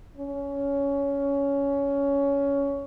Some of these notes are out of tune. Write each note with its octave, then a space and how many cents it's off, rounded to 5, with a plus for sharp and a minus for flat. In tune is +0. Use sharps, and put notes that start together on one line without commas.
C#4 +15